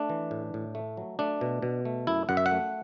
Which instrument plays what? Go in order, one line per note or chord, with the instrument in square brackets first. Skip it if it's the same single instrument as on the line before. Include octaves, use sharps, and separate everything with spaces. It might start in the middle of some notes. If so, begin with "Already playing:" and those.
Already playing: [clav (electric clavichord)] A3 D4
E3
A2
A2
A3
F#3
A3 D4
B2
B2
A3
F#2 E4
F#2 F#5
E5
F#5
A3